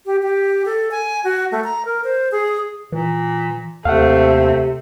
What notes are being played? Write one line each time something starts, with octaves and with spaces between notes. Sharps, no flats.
G4
G4
A4
G#5
F#4
A3
A#5
A#4
C5
G#4
A#2 E3
D#2 C3 A3 C4 F5 F#5